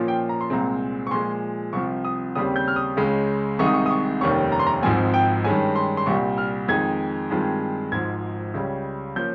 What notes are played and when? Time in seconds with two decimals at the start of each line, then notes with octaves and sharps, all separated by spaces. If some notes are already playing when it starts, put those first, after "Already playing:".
Already playing: A#2 F3 A#3 C#4 F4
0.08 G5
0.29 A#5
0.41 C6
0.50 C2 A#2 G#3 C4 A#5
1.07 C#6
1.11 A#2 F3 G#3 C6
1.73 C2 C3 F3 C#6
2.05 D#6
2.35 D#2 C#3 G3 C4 D#6
2.56 G6
2.68 F6
2.76 D#6
2.97 C#2 C#3 G#3
3.59 C2 C3 D#3 G#3 D#4 C#6
3.66 D#6
3.74 C#6
3.86 D#6
3.91 C#6
4.21 F1 D#2 D#3 G3 C#4 C#6
4.52 A#5
4.60 C6
4.67 A#5
4.82 G#1 G#2 F3 C4 G#5
5.14 G5
5.44 G2 D#3 G#3 C#4 G#5
5.76 C6
5.97 C6
6.06 C2 A#2 G3 C#6
6.38 F6
6.68 F2 D#3 G#3 D#4 G#6
7.30 G2 D#3 G#3 C4 F4
7.92 G#1 G#2 F3 G#6
8.54 C#2 C#3 G3
9.16 F3 A#3 C#4 G6